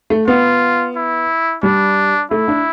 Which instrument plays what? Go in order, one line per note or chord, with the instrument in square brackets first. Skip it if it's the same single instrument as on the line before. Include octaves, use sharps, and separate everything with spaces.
[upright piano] A3
[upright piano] B3 [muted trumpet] F4
[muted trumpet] E4
[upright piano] G3 [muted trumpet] D4
[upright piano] A3 [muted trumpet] E4
[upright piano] D4